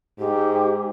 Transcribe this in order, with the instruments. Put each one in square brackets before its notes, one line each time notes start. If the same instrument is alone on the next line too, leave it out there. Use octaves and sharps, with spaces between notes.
[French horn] G#2 [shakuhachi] G4